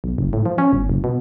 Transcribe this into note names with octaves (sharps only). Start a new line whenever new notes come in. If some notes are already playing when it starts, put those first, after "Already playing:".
B1
F#1
A2
F3
C#4
G1
F#1
B2